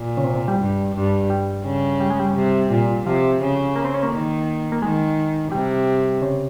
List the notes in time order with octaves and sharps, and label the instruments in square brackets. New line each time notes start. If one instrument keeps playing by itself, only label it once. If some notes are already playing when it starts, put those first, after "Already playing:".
Already playing: [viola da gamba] A#2
[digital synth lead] C#3
C3
C3
G3
[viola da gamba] G2
G2
[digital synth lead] G3
[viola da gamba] C#3
[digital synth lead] G3
G#3
G3
[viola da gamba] C3
A#2
[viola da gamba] C3 [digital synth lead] F3
[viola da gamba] C#3
[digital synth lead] A#3
C4
C#4
A#3
[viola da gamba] D#3
[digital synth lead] A#3
[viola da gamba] D#3 [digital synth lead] G#3
[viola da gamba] C3 [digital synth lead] G3
[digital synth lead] C#3